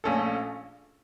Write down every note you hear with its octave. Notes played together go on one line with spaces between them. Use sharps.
A#1 A#2 A3 C#4 A4